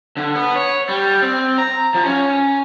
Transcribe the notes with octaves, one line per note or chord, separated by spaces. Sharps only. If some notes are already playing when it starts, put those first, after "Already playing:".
D3
B3
C#5
G3
C4
A#5
F3
C#4